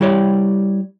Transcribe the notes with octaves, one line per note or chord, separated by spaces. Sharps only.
G3 E4 G4 C#5 D5